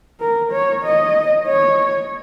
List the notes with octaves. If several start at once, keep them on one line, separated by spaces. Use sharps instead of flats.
A#4
C#5
D#5
C#5